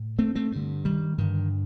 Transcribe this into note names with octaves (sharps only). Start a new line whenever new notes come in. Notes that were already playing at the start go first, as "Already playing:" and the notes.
Already playing: A2
A3 C4
A3 C4
G2 D3
D#3 G3
G2 D3 D#3